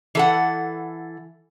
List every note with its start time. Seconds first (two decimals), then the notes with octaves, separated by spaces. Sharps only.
0.15 E3 A4 F#5